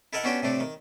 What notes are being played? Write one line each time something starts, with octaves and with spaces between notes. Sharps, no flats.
E4 A4 A#4 D#5 F#5
B3 C#4 D4 F#4 G4 G5
A2 C3 A3 D4
D#3